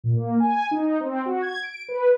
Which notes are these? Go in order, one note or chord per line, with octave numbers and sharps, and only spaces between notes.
A#2
A#3
G#5
D#4
C4
F#4
G#6
D7
B4